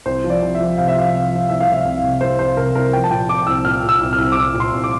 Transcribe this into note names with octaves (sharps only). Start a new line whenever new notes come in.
C2 C5
F3
D5
C2
E5
F3
C3 F5
E5
F3 F5
C2
F3
C2 E5
F5
C3 E5
C2
C3
C2 C5
C2 C5
C3 A#4
C2 A#4
F3 G5
A5
A#2 G5
A#2 D6
C2 E6
A#2 F6
A#2
E6
C2
F6
C2
D6
C2 E6
A#2
C6
C2
D6